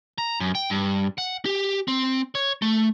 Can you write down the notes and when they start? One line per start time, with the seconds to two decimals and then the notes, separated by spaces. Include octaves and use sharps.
0.18 A#5
0.40 F#2
0.55 G5
0.70 G2
1.18 F#5
1.45 G4
1.88 C4
2.35 C#5
2.62 A3